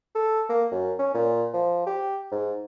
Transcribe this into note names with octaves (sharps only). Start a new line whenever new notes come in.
A4
A#3
F#2
C#4
A#2
F3
G4
G#2